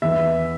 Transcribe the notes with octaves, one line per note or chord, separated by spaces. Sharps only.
E2 E3 E5